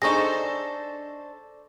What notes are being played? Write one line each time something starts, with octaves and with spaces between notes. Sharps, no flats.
D4 D#4 G#4 A4 C5 C#6 A#6